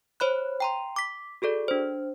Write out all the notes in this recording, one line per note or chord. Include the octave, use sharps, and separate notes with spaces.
C5 C#5 B5 F#6
G5 A#5 C6
D6 B6
F#4 G#4 A4 D5
D4 C5